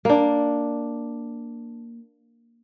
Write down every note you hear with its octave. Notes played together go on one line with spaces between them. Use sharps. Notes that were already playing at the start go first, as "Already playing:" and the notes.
A#3 D4